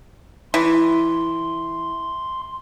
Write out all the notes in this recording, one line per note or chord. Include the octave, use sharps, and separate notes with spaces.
E3 C6